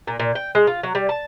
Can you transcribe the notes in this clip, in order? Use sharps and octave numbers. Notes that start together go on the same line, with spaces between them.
A#2
A#2
G5
G#3
F4
F#3
G3
A5